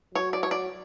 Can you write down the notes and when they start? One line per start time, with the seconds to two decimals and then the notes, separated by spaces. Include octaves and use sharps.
0.15 F#3 C#5
0.33 D5
0.43 C#5
0.51 D5